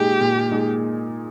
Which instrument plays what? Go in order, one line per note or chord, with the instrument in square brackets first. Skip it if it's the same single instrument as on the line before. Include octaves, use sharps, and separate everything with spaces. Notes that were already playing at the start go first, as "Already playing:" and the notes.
Already playing: [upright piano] A#2 G#3 D#4 G#4 [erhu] G4
[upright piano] A#2
G#3 D#4 G#4